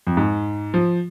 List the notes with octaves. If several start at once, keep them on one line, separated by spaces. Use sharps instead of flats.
F2
G#2
F3